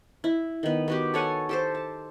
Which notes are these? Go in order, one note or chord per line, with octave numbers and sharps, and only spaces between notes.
E4
D#3 B3
B3 F#4 G4
A4 C#5 F#5 G#5
G4 A4 C5
A5